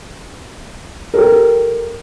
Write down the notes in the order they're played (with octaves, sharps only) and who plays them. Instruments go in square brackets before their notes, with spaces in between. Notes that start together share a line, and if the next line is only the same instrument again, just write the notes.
[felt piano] G4 A4 A#4